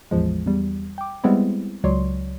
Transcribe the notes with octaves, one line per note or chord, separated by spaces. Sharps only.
A1 E2 F3 G#3
E2 G3
G5 D6
G3 G#3 B3 C4 E4
C#2 F#3 C#5 D5 C6